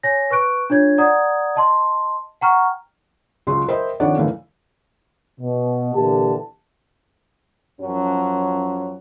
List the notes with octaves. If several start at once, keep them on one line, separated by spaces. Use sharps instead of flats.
C#5 G#5 A#6
B4 C#6 F#6 D7
D4 F4 C#5 G#6
D5 F#5 A#5 D#6 G#6
D#5 A5 C6
F#5 G5 A#5 C#6 F6
C#2 F#3 G#3 F#4 C6
A#4 C5 D#5 E5 G5 B5
F2 D#3 D4 C#5 D5 F#5
F#1 D3 E3 A3 F5
B2
A#2 D3 E3 G4 A5
F#2 F3 F#3 C#4